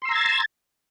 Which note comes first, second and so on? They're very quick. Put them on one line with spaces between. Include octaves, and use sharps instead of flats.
C6 E6 A#5 G#6 A6